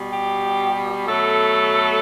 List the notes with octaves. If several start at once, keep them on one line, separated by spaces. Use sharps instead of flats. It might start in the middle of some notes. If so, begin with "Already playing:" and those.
Already playing: B2 G3
G4
B2 F#3 A3 A4